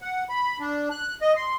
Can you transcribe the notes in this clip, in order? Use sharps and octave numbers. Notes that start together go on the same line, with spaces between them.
F#5
B5
D4
F#6
D#5
C6